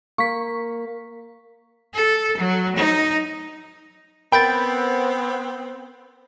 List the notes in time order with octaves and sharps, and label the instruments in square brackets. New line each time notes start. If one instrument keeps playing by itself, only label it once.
[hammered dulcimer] A#3 [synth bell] C#6 B6
[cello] A4
F#3
D#4
[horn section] B3 C4 [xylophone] A#4 G6 D7 [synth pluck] G5 A6 [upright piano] B5